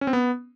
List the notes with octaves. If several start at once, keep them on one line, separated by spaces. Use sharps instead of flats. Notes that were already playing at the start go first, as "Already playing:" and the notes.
C#4
C4
B3